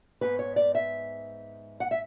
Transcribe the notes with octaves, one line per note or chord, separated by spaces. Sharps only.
G#2 G#3 B3 B4
C#5
D5
E5
F#5
E5